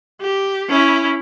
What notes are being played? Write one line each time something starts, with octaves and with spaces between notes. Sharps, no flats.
G4
C#4 E4